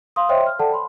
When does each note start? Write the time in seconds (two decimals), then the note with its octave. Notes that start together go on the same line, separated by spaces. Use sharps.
0.16 F5 C6 D#6
0.29 C5 C#5 D#5 E5 G5 C6
0.46 F6
0.59 A4 D5 F#5 G5 A5
0.72 B5 C6